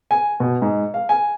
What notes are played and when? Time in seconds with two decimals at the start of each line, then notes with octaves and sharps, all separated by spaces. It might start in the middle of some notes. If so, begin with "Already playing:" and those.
0.11 G#5
0.40 B2
0.62 G#2
0.94 F5
1.09 G#5